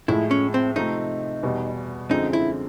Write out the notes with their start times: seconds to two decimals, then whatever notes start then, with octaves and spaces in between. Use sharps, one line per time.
0.08 A2 F3 G#3 E4
0.31 C#4
0.54 C4
0.76 C3 F3 A3 C4 D#4
1.43 E2 B2 G3
2.10 F#2 D3 F3 G#3 C4 D#4
2.33 E4